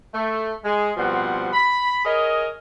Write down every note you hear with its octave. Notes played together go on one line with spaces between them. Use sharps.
A3
G#3 G#4
G2 B2 F3 G3 C4 F#5
B5
G#4 A#4 C#5 D#5